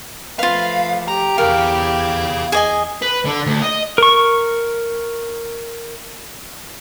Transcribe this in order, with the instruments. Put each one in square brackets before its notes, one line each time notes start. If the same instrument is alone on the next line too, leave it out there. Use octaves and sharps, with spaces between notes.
[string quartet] F3 A3 [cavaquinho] F4 B4 [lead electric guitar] F5
[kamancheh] G4 [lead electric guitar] A#5
[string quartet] E2 D6 G#6 [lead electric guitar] G#4 F5 [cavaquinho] A#4
[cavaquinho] G#4 D#5 G#5
[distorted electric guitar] B4
D3
D2
D#5
[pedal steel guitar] A#4 C#6